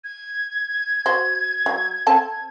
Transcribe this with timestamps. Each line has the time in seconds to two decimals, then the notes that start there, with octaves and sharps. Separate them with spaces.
0.04 G#6
1.06 F#4 C5
1.66 F#3
2.07 C4 A4 A5